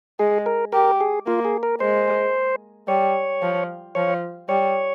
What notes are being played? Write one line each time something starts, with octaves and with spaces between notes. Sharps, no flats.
G#3 G#4
A#4
G4 A#4
G#4
A#3 F4
G#4
A#4
G#3 C5
G3 C#5
F3
F3 C#5
G3 C#5